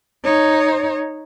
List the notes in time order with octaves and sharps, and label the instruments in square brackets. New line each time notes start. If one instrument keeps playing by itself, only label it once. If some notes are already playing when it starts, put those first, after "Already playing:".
[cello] D#4 C#5